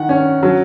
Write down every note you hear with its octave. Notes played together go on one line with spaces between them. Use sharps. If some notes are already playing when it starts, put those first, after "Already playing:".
Already playing: D#3 F#5
C#4
F#3